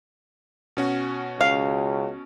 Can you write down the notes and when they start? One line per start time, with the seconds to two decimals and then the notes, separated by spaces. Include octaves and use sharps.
0.77 B2 C#4 F#4
1.41 C#2 F5